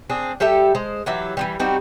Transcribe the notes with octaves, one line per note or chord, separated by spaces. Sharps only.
C4 D4 G#4
G3 G4 A4 E5
G#3 C5
E3 F#3 G4 E5
E3 F3 G3
G3 C4 D#4 F#4